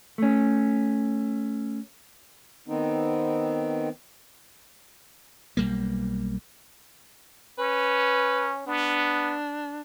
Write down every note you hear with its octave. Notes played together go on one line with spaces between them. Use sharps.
A3 C#4
D#3 B3 C4 D#4
B1 G3 A#3
C#4 B4
B3 D4